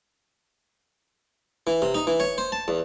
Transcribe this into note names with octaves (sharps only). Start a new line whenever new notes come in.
E3
C3
D#4
E3
C#5
C5
A5
E2